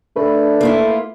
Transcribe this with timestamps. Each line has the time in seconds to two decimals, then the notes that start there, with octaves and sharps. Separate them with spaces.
0.16 A3 D4 B4
0.61 A#3 E4 F4